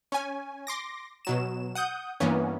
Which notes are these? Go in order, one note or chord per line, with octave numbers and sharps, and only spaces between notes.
C#4 G#5
C6 D6 A#6
B2 F#3 E7
F#5 D#6 G6
G2 E3 A#3 B3 C#4